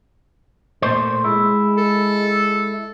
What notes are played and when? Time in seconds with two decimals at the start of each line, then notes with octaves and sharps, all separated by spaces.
0.82 A#2 A3 C5
1.24 G#3 E4
1.77 A4